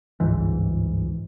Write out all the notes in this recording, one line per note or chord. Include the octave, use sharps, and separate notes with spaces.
G1 C#2 G#2 E3